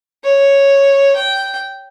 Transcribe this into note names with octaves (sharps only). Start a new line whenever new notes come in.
C#5
G5